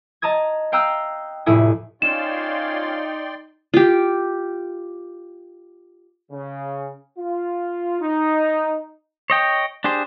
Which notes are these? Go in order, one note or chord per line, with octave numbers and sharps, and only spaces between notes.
D#5 A5 A#5 D#6 G#6
F5 G5 A#5 D#6 E6 F#6
F1 A2 E4 G#5 D#6
C#4 D#4 F4 D5 G5 C6 E7
F4 G4
C#3
F4
D#4
C#5 D#5 G5
D4 G4 G#4 C5